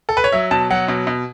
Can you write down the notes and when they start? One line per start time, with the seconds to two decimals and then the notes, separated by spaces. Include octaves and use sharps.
0.09 A4
0.17 B4
0.24 C#5
0.32 F#3 E5
0.51 B2 A5
0.70 F#3 F#5
0.88 B2
1.07 B2